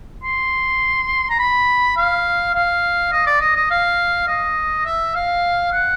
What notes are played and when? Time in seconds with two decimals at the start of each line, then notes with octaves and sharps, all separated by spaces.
0.23 C6
1.30 A#5
1.39 B5
1.96 F5
2.54 F5
3.12 D#5
3.27 D5
3.41 D#5
3.55 D#5
3.70 F5
4.28 D#5
4.85 E5
5.15 F5
5.72 F#5